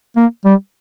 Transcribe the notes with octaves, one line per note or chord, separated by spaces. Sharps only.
A#3
G3